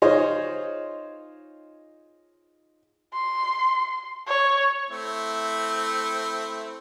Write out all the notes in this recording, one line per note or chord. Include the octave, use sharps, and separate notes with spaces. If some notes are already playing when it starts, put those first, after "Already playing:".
D#4 F4 G#4 C5 C#5 D#5
C6
C#5
A3 C4 E4